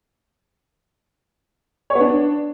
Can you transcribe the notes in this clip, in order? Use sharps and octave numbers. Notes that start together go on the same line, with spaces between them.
C#5
B3
D4